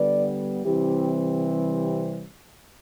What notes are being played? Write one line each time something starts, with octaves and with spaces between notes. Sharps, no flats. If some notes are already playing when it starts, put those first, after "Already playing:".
Already playing: D3 G3 B3 B4 D5
C3 E3 G3 C4 E4 G4